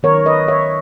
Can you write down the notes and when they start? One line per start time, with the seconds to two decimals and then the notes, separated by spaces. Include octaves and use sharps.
0.03 D#3 F#3 B3 A#4 C#5
0.26 B4 D#5
0.48 C#5 E5